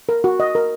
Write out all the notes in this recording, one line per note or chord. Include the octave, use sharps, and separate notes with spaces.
A#4
F#4
D#5
A#4